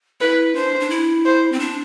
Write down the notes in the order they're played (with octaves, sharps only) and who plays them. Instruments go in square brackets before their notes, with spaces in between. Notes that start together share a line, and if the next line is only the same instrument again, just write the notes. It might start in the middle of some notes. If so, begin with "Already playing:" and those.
[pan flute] E4 [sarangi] B4
[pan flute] D4 [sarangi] C5
[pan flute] D4
E4
[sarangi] C5
[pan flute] C4
D4